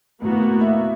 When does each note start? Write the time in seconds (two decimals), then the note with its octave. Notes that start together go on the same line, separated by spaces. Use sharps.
0.21 D2 A2 A#3 B3 F#4
0.61 E5